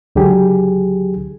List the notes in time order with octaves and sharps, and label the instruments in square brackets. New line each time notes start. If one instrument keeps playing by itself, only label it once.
[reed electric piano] C#2 D3 F#3 G4 G#4